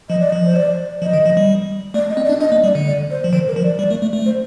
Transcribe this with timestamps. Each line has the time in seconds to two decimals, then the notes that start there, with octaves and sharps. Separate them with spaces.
0.09 F3 D#5
0.20 D5
0.30 F3 D#5
0.45 C5
0.56 D5
1.02 F3 D#5
1.13 D#3
1.26 F3
1.37 G3
1.94 A3 D5
2.10 D#5
2.17 C4
2.25 D5
2.29 D4
2.40 D4 D#5
2.52 A#3
2.64 G3 D5
2.75 D3
2.87 D5
3.10 C5
3.24 F3
3.32 D#3 C5
3.48 A#4
3.56 F3
3.63 D5
3.78 G3 D5
3.90 A3
4.02 A3
4.13 A3
4.26 C5